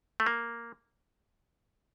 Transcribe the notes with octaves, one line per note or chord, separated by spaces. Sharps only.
A3
A#3